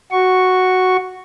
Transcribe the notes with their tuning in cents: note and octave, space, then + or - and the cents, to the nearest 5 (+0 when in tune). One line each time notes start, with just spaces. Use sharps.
F#4 +0 C#6 +0